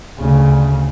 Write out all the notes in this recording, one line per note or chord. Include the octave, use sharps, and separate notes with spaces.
D2 C#3